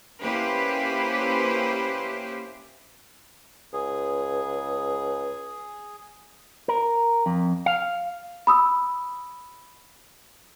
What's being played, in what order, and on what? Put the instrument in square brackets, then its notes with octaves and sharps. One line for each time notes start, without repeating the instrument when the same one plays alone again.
[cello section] A#3 C#4 E4 G4 B4 C5
[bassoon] C#2 [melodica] G#4
[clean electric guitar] A#4
F2
F5
[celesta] B5 D#6 E6